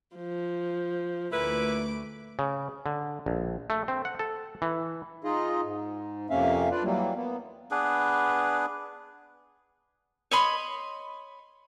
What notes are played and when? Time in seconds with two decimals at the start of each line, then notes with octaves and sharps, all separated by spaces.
0.17 F3
1.33 D2 A#2 A3 E4 B4 D6
2.39 C#3
2.86 D3
3.26 A#1
3.70 A3
3.88 C4
4.05 F#5
4.19 A4
4.62 E3
5.24 D#4 F4 G#4 D#5
5.64 G#2
6.30 F2 C3 A#3 C#4 E5 F5
6.71 D4 F4 B4 D5
6.83 E3 F#3 G3 A#3
7.15 A#3 B3
7.71 B3 D4 G#4 B4
10.31 C#5 D#5 B5 C6